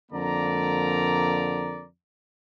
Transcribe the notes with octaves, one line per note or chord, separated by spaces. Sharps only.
F2 D3 A#3 A#4 D5 A#5